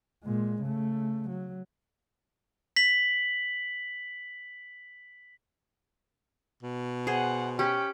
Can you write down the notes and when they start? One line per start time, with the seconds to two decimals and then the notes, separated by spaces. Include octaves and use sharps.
0.24 A#2 G#3
0.62 C#3 A3
1.30 F#3
2.76 B6 F#7
6.63 B2
7.07 G#4 C5 F#5
7.59 C#4 G4 G5